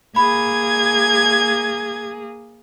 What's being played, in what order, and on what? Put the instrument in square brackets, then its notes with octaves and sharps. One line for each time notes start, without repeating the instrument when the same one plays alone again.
[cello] A#3 G#4 [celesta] B5 [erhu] G#6